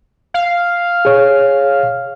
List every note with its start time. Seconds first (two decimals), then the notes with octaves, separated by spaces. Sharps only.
0.34 F5
1.05 G#4 C#5